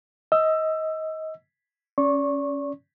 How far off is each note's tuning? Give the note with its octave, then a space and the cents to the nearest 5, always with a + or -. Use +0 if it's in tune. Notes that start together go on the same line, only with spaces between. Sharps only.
D#5 +25 E6 +20
C#4 +0 D5 -35 C#6 -20